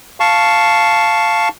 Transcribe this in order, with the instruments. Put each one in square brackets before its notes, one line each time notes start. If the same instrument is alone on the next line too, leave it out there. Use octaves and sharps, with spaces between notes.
[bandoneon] F5 A5 C#6